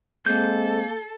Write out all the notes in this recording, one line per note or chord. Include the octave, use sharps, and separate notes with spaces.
G#3 A#3 C4 A4 G6